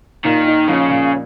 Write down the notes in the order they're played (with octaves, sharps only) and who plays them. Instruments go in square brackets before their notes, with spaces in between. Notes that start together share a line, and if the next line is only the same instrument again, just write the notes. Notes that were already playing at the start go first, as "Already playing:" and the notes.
[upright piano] A#2 [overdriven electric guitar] D#3
[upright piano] D#4
[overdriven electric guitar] C#3 [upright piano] F3
[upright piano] A#2